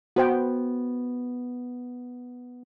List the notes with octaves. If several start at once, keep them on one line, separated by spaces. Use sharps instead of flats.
B3 F#4 C5 G5